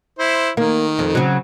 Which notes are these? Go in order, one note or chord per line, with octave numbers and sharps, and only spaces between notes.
E4 C5
D#3 A#3
F2
C#3 F#3